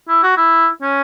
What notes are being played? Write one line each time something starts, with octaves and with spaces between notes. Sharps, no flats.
E4
F#4
E4
C#4